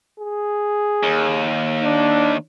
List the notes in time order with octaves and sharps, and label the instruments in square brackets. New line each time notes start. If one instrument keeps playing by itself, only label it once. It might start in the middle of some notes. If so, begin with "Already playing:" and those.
[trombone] G#4
[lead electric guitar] D#2
[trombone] D4